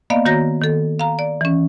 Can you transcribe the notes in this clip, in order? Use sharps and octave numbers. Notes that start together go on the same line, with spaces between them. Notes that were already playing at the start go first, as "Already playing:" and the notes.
A#3 B3 D5 D#5 F5
D#3 F#4 C#5 A#5 G6 A#6
D#3 A4
F5 A#5
D5
E3 C#4